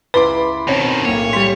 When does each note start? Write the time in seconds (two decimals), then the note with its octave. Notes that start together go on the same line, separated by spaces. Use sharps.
0.14 C#2 E4 B4 B5 C6 D6 G7
0.68 B2 D#3 C4 C#4 C#5
1.05 B1 A2 A#3 C#5 D#7
1.33 G3 C6 B6